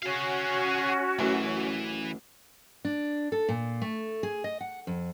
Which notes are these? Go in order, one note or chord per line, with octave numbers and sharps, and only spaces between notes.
C#4 F#4 G#4 F5
A1 F#2 E3
D4
A4
A#2
A3
G#4
D#5
F#5
F2